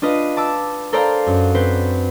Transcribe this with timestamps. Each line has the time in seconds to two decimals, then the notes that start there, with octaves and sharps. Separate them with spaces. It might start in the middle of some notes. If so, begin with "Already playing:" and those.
0.02 D4 F4 B4 D#5
0.37 A5 D6 E6
0.93 A4 A#4 C5 D5 F5 A#5
1.26 F#2
1.54 C4 B4 C5